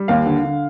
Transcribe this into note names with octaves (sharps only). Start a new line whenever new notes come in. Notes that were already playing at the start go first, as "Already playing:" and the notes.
Already playing: G3
D#2 F5
D3
D3